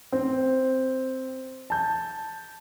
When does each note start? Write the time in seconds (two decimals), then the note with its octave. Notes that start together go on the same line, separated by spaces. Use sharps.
0.12 C4
1.70 A5 G6